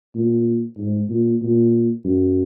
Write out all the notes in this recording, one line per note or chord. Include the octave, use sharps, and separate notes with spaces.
A#2
G#2
A#2
A#2
F#2